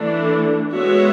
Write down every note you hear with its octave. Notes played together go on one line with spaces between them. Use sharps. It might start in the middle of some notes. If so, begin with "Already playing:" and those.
Already playing: E3 A3 D4
G#3 B3 F#4 C#5 E5